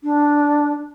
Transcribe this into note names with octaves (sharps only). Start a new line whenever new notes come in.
D4